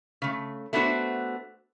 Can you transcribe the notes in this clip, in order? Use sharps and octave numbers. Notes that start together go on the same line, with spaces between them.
C#3 A3
A3 B3 D4 F#4 C5